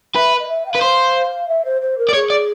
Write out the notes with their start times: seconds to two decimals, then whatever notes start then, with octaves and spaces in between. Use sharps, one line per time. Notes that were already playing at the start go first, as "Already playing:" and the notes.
0.15 B4 E5
0.39 D#5
0.48 E5
0.65 G5
0.70 F5
0.75 B4
0.82 C5
1.47 E5
1.64 C5
1.81 C5
1.98 A#4
2.09 D5
2.14 G#4 C#5
2.30 D5